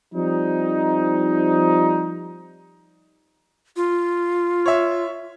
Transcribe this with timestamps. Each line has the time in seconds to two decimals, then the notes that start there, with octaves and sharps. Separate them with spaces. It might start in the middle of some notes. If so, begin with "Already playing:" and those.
0.14 F3 G3 C4 D#4
3.76 F4
4.66 C#5 E5